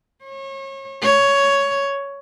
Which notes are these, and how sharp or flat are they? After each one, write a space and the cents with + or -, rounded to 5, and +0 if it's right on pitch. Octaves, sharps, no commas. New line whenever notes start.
C#5 -30
C#5 +10